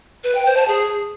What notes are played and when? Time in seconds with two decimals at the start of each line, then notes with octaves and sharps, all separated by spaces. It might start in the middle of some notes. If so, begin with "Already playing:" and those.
0.24 B4
0.35 G5
0.46 C5
0.57 A5
0.68 G#4